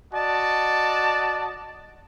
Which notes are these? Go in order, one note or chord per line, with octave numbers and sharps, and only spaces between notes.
F#4 D5 D#5 A5